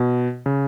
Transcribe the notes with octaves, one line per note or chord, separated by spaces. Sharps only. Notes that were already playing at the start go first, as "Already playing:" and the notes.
Already playing: B2
C#3